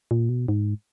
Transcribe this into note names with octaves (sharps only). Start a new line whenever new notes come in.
A#2
B2
G#2